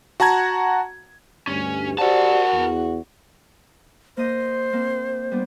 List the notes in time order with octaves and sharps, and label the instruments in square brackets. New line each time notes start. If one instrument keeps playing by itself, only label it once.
[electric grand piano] F#4 F#5 A5 A#5 G#6
[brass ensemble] D2 G2 [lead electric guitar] C#4
[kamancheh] F#4 [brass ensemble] G4 C5 D5 [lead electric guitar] A#4 A5
[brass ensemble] E2
[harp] A#3 D#5 [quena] C5
[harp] A#3 C4
G3 B3 D4